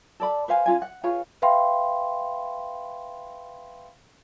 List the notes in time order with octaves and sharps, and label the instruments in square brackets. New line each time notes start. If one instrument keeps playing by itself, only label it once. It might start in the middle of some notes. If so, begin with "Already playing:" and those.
[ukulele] A4 D5 B5
B4 C5 F5 G#5
C#4 F4 G#5
F#5
F4 G#4 B4 C#5
[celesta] B4 E5 F5 G5 B5 C6